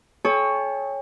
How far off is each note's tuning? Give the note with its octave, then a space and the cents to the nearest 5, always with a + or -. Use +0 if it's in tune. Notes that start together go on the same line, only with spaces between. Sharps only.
A4 -45 C#5 +0 G5 +35